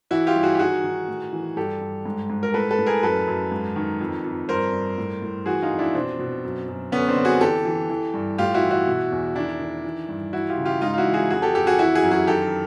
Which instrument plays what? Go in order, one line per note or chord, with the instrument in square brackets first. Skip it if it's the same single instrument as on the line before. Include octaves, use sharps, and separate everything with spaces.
[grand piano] E3 E4 F#4
F4 G4
G2
F#4 G#4
G4
D#3 F#4 G#4
D#3
A2
E3
G2 G4 A4
G2
G#2
G#2
A#4
A2 A4 B4
A4 B4
A2
G#4 A#4
F#2 A4 B4
F#2
G#2
D#3
F2
F2
G2 A#4 C5
G2
A2
A2
E3 F#4 G#4
D#4 F4
F2
D4 E4
B2 C4 D4
B2
F#2
F#2
D3 B3 C#4
C4 D4
D3
F#4 G#4
E3 G4 A4
E3
E3
G2
A2 F4 G4
E4 F#4
E3
E4 F#4
B2
E2
D#3 D4 E4
D#3
E3
G2
E3 E4 F#4
F4 G4
C#3
F4 G4
G#2 D#4 F4
F4
E4 F#4
E3
F#4 G#4
F2 F#4 G#4
G4 A4
F2 G4 A4
F#4 G#4
E3 E4 F#4
F#4 G#4
F#2
F#4 G#4
D#3 G4 A4